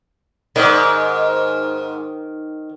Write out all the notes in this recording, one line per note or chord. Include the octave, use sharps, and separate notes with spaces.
G#2 D#3